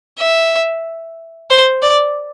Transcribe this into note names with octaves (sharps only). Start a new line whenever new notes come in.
E5
C5
D5